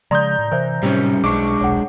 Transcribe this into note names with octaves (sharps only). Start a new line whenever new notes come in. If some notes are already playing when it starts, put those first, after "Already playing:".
C#3 F3 G#3 D5 A#5 C6 D#6 G6
A2
C3 E3 A#4 C5 E5
A2 C3 F#3 G3 C#4
B1 G#3 D4 C#6 D6
D#1 B1 C#5 F#5